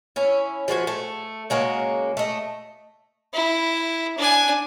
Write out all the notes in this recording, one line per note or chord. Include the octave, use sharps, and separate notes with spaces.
C#4 E4
F3 G#3 F#4 G#5
A3
C#3 G#3 A#3 F#4
A3 D#5
E4
D4 G#5